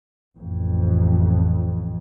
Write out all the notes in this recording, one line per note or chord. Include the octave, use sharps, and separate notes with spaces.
A1 F2